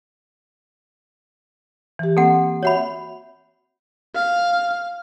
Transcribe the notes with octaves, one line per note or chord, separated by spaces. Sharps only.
E3 G4
A#3 C4 A4 F#5
F#4 C#5 E5 F#5 B5
F5